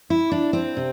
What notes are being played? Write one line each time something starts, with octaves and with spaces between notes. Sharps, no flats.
E4
D4
C4
C3